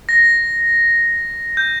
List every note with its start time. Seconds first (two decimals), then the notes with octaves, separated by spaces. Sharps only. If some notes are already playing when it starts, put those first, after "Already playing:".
0.09 A#6
1.57 G6